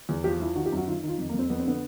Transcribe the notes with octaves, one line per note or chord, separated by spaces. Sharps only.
E2
F3 G4
F3 E4
D#3 F#4
G4
F#2
F#4
D#3 F4
D#3 F4
F2
A#3
F2 C4
F2 B3
C4
D3 B3